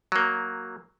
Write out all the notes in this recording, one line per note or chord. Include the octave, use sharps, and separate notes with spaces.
F#3 A#3